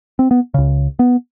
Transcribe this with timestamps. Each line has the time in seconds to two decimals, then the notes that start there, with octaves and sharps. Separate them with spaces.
0.19 C4
0.31 B3
0.54 C#2 C#3
0.99 B3